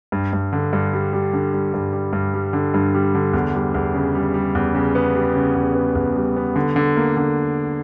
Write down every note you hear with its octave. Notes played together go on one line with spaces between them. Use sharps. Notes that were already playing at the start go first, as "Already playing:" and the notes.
G2
G2
D3
G2
G3
G3
D3
G3
G2
G3
G2
G3
D3
G2
G3
D3
E2
G3
E2
C#3
G3
G3
E2
C#3
B3
G3
C#3
E2
B3
E2
G3
B3
D3
D3
A#3
D3